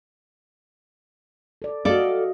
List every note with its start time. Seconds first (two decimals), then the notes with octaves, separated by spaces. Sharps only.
1.62 A4 D5
1.85 F#4 A4 D5 D#5 F5